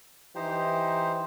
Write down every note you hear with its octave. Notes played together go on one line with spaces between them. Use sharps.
E3 D#4 G4 C5